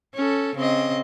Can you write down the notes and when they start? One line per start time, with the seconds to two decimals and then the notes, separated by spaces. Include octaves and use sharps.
0.15 C#4 A4
0.56 C#3 C4 D#5